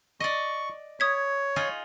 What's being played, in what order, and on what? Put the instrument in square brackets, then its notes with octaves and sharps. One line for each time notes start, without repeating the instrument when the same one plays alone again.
[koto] D5 D#5 [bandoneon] C#6
[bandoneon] C#5 [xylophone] D#6 G#6 B6
[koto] D#4 F4 G#4